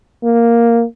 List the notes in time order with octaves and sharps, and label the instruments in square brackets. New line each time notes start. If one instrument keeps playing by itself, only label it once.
[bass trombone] A#3